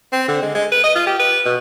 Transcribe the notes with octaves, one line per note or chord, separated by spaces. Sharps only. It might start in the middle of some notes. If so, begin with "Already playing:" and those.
C4
D3
G#3
G#3
B4
D#5
F4
G4
B4
B2